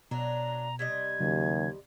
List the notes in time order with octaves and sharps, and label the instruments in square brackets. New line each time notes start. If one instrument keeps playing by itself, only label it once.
[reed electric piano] B2 [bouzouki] F#3 D4 [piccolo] A#5
[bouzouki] C3 G3 D#5 [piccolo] G#6
[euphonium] D#2 [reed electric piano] C#3 F#3